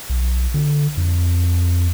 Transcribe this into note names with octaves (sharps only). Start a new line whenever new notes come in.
B1
D3
F2